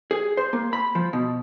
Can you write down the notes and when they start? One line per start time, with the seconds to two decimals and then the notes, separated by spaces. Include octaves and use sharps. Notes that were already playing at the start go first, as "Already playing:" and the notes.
0.11 G#4
0.37 C5
0.53 A#3
0.73 B5
0.95 F3
1.13 B2